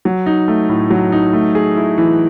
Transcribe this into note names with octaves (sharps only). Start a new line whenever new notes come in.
F#3
D#4
A3
A2
F#3
D#4
A3
G#4
E4
E3